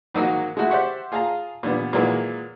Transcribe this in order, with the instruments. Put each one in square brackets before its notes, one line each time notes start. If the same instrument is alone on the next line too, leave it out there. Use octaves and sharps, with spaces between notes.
[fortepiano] G#2 D#3 F#3 A#3 D#4 F#4
G#3 A3 E4 F#4 A4
G4 C5 D5 E5 F#5 C#6
F4 G#4 F5 A5 A#5
A#2 D3 G3 B3
A#2 D#3 E3 F#3 G#3 A#3